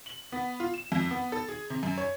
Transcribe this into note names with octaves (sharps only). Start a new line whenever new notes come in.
F#7
B3
F4
E7
F2
B3
A4
G#4
C3
F#2
C#5